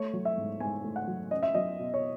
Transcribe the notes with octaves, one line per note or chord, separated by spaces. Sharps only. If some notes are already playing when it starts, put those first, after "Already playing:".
Already playing: A3 C#5
F#3
E5
G#2
G#2 G#5
A3
F#5
F#3
C#4 D#5
E5
F#3 D#5
B2
C#5